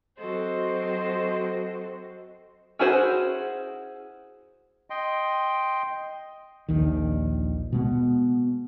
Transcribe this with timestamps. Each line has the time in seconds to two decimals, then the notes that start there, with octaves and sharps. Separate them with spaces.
0.18 F#3 C4 F#4 A4 C5 D#5
2.79 C#4 E4 F#4 G#4 C5
4.90 D#5 G5 C6
6.68 A#1 D#2 D#3
7.73 B2 G#3 B3